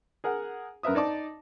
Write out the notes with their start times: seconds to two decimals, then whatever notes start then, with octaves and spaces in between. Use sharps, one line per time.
0.24 G#4 A#4 F#5
0.83 F#2 A#4 B4 E5 D#6
0.95 D#4 D5 A5 D6